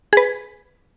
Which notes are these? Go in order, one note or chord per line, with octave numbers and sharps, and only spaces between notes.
G#4 B4